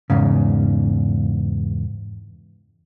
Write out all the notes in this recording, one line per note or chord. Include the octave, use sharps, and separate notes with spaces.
E2 G#2 C#3